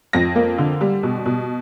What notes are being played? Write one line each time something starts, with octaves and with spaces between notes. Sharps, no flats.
F2 A#6
A#3
D3
G3
B2
B2